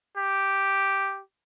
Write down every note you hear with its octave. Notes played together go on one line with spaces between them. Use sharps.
G4